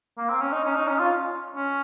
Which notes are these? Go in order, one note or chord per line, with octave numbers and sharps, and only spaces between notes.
A#3
C4
C#4
D#4
C#4
D#4
C#4
F4
C#4